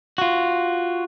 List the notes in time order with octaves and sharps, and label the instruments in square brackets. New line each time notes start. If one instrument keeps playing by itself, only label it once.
[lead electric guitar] F4 F#4